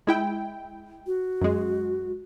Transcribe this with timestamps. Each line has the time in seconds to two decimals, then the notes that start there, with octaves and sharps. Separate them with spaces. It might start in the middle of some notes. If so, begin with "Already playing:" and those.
0.07 G#3 E4 G5
1.07 F#4
1.41 F#2 G#3